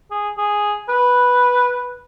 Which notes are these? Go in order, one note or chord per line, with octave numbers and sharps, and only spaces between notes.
G#4
G#4
B4